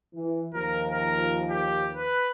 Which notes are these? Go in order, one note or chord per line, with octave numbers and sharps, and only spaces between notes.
E3
D#2 F3 A#4
A#4
G4
B4